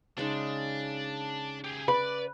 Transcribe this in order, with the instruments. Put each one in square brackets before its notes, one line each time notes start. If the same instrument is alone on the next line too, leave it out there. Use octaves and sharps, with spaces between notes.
[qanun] C#3 G#3 D#4 [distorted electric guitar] D4
[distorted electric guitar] G4 G#4
[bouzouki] B4 [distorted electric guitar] D5